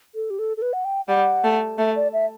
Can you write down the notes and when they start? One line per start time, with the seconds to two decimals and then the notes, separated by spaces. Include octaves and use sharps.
0.15 A4
0.30 G4
0.39 A4
0.57 A4
0.62 B4
0.73 F#5
0.85 G5
1.08 G3 F#5
1.44 A3
1.78 A3 E5
1.96 D5
2.13 E5